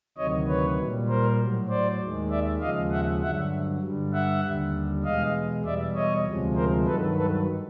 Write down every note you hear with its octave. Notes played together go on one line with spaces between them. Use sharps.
D2 C3 D#3 F#3 C#5 D#5
B4 C#5
A#2 G3
A#4 C5
A2 F#3
C5 D5
D#2 D#3 G#3
D5 E5
D#2 C#3 F3 G#3 D#5 F5
E5 F#5
G2 D3 F#3 E5 F#5
G2 D3 G3
E5 F#5
D#2 D3 G3
E2 B2 G#3 D#5 F5
E2 B2 G3 D5 E5
C#5 D#5
D2 C3 F3 G#3
A#4 C5
G2 D#3 F#3 A4 B4
A4 B4